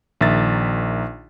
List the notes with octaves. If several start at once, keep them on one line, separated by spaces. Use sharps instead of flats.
A#1 D#3 E5 A6